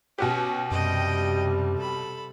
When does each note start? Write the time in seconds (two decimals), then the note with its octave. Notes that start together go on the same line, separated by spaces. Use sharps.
0.18 B2 C#4 F#4 G4
0.71 F#2 C3 G3 D#5 G5
1.77 A4 B5